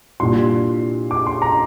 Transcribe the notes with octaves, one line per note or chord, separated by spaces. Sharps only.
C2 A#2 G3 D4 C6
D6
C6
A#5